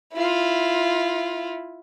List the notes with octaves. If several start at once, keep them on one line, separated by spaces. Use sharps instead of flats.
E4 F4